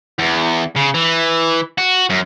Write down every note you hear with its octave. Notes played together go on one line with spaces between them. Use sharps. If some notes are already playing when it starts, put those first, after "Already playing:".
E2
C#3
E3
F#4
F#2